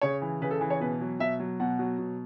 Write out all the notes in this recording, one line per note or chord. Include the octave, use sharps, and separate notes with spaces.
C#3 C#5
E3
C#3 B4
A4
E3
C#5
B2 B4
F#3
B2 E5
F#3
B2 F#5
F#3
B2